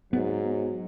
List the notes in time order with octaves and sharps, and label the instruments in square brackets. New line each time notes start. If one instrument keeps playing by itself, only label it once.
[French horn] G#2 [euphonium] F#3 [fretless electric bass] B3